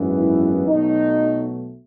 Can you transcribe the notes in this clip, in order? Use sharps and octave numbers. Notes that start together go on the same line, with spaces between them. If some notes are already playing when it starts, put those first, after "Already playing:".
Already playing: G#1 F#2 E3 B3
E4
B1 B2 F#3 A3 D#4